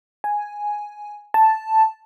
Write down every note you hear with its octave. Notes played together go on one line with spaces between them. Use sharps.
G#5
A5